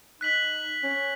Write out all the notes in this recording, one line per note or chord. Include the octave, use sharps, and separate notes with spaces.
D#4 F#6 B6 F#7
C#4